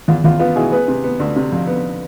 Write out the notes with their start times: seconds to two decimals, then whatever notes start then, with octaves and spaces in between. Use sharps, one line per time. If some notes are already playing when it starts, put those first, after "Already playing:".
0.08 E2 F4
0.24 E2 F4
0.40 B3 F4
0.56 B2 E4 G#4
0.72 B3 G#4 B4
0.88 C3
1.04 B3
1.20 D2
1.36 C3
1.52 F2
1.67 B3